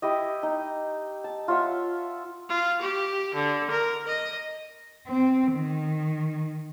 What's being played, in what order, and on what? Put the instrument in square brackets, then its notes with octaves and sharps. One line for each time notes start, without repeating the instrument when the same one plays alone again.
[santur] E4 G4 D#5
D#4
A5
F4 C#5 E5 F#5
[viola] F4
G4
D3
A#4
D#5
[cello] C4
D#3